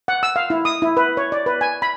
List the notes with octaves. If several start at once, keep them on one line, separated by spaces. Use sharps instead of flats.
F#5
E6
F5
E4
D#6
E4
B4
C#5
D5
B4
G#5
B5